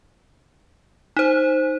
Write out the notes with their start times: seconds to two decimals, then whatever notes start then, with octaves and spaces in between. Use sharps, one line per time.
1.16 D#4 C5